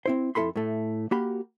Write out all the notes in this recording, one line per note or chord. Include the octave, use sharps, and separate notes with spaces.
C4 E4 C5
F2 E4 A4 B5 C6
A2 A3
A#3 F#4 G4 B5